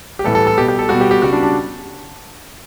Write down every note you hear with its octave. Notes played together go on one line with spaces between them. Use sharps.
G4
A2 E3 G3 A4
A4
A4
B2 G3 G4
G4
A4
B2 G3 F#4
G4
G4
C#3 G3 F#4
D4
D4